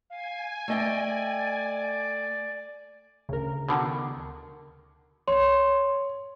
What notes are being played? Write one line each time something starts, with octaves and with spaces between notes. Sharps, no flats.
F5 G#5
A3 D5 D#5 G5
D2 C#3 A#4
B2 D3 D#3
C#5 C6